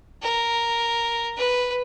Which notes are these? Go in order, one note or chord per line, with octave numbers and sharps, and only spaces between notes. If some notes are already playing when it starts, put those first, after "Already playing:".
A#4
B4